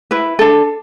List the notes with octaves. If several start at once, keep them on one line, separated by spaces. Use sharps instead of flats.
E4 B4
D4 A4